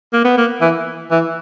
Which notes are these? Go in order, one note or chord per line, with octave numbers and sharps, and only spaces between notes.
A#3
B3
A#3
E3
E3